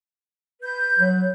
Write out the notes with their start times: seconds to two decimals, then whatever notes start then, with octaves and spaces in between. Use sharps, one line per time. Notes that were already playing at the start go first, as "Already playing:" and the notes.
0.62 B4 G6
0.99 F#3